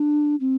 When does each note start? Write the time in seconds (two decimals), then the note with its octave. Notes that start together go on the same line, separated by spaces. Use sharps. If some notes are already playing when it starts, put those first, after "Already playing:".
Already playing: D4
0.41 C4